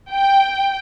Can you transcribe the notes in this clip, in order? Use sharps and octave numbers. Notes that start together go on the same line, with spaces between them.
G5